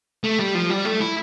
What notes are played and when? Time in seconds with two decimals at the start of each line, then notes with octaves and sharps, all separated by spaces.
0.24 A3
0.39 G3
0.55 F3
0.70 G3
0.85 A3
1.01 E4